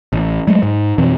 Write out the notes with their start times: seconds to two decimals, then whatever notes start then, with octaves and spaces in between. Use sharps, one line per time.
0.13 A1
0.48 F#3 G#3 A3
0.63 G#2
0.98 F2 B2 E3 C4